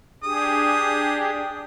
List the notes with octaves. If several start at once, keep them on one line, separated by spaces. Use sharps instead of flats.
D4 G4 G#4 D#6